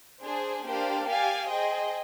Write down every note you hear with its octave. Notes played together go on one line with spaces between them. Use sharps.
D4 G#4 C5
A#3 D4 G4 C5 F5
G4 D5 F5 G#5
G#4 C5 D#5 G5